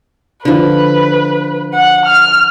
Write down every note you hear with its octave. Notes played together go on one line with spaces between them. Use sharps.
D3 F3 B4
F#5
F6